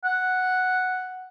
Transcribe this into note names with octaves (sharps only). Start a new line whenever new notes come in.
F#5